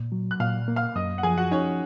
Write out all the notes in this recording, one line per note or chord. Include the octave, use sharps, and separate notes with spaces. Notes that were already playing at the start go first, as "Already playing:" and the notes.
Already playing: A#2
F#3
F#6
A#2 F5 F6
A#3
F5 F6
F#2 D#5 D#6
F#5
F3 G#4 G#5
F#4 F#5
C#4 D#4 C#5